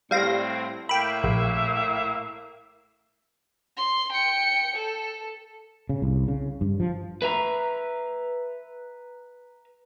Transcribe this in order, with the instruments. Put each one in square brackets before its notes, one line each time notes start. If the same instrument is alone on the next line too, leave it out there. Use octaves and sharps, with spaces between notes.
[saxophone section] A2 C4 [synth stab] G3 F5 A#6
[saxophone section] A2 A#3 E5 [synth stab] G5 B5
[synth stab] A#1
[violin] C6
G5 C#7
A4
[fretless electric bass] C#3
C2
C#3
G2
F3
[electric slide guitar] B4 E5 A#5